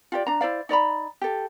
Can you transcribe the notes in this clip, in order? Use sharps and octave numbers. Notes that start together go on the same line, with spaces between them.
F4 G4 D5
D4 A#5
E4 C5 D5 F5
D#4 D5 A#5 B5
G4 A4